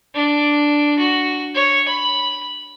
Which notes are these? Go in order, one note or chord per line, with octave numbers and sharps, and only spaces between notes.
D4
F#4
C#5
B5